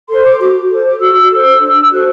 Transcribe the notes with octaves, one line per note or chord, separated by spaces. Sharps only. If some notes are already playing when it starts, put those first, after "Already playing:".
A4 C5 C6
D6
F#4 D6
A4 C5
D6
F#4 E6
A4 C5 E6
D4 E6
F#4 A4 C5 F#6